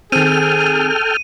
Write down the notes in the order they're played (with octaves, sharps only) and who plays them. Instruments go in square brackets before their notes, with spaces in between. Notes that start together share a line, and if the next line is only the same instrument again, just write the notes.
[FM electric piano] D#3 C4 [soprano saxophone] G#4 [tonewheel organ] A4 G5 F6 [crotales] D#7